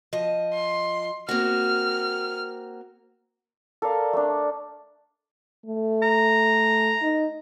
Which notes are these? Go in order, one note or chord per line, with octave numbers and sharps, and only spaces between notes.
F3 D#5
C6
A#3 C4 F#4 F6
A4 A#4 D5 F5
A3 D4
A3
A#5
D#4